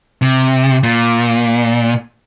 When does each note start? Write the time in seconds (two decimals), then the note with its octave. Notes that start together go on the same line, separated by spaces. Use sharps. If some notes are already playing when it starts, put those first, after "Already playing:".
0.22 C3
0.83 A#2